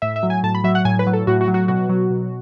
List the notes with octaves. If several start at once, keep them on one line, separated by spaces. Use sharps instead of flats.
A2 E5
E5
F#3
G#5
A2 A5
B5
F#3 E5
F#5
A2 G#5
B4
F#3
A4
A2 F#4
F#4
F#3
F#4
B2 F#4
F#3
B2